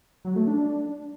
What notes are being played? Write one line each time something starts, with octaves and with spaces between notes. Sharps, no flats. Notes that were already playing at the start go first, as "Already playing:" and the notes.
F#3
A3
D4